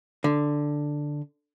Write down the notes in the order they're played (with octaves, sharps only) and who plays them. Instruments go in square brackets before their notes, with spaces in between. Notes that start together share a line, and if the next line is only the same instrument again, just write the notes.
[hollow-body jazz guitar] D3